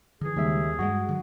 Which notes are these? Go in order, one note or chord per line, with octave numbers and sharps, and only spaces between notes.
D3 E3 G#4
D#2 C#3 G3 G#3 E5
G2 G3 G#3 F#4
D3 F#3